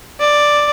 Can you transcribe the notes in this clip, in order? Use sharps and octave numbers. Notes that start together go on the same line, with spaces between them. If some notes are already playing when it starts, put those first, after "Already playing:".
D5